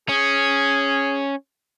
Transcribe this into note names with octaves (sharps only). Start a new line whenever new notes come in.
C#4 G#4